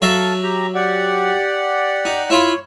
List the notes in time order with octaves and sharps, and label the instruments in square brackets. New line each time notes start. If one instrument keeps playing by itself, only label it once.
[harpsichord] F#3 F#4 E5 [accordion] A4 F5 A5
[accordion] G4 A#5
G4 D5 F#5
[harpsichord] D#4
[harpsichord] E4 F4 B5 [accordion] C#5